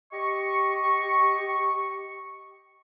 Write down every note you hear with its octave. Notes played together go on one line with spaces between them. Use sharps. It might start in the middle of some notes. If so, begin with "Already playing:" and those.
G4 D#5 C#6